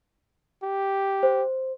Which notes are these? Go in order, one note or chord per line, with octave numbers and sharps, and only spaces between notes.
G4
C5